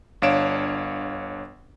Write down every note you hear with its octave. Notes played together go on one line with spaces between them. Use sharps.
G1 D4 C#5 F5 D7 E7